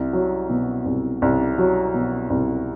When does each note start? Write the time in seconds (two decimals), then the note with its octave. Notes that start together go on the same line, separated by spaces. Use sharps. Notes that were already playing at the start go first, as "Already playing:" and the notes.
Already playing: C2
0.13 F#3
0.50 B2
0.85 C2
1.22 C2
1.58 F#3
1.94 B2
2.30 C2